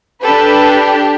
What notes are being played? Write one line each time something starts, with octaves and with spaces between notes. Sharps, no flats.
D4 G4 A4 B4